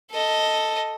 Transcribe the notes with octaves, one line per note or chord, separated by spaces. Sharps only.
A4 D#5